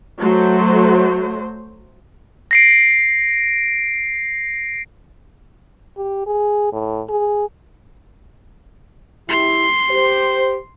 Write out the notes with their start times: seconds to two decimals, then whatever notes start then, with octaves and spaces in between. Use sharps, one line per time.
0.20 F#3 A3 C5
2.51 A#6 C7 D7
5.97 G4
6.27 G#4
6.73 A2
7.09 G#4
9.29 E4 G4 C6
9.89 G4 C5